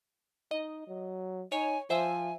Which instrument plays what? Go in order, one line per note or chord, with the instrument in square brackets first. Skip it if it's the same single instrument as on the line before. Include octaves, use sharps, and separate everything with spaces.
[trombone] D#4 [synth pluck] D#5
[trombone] F#3
[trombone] D#4 [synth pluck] C#5 [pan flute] G#5
[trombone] F3 [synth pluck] C5 E5 [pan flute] G#5